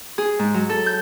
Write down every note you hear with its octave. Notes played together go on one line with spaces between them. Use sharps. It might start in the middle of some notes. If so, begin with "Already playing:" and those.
G#4
G#2
F#3
A4
G6